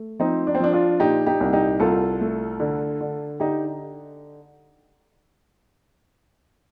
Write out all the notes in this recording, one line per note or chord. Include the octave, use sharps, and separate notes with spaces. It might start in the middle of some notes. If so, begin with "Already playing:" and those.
Already playing: A3
F3 C4 D#4
D4
C4
F3 D4
D4 F4
A#2 D#4 G4
D#4 G4
C2
D#4 G4
C2 F4 A4
A3
D3
D3
D3 D#4 G4